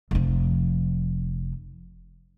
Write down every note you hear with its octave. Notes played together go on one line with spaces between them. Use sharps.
F1 F3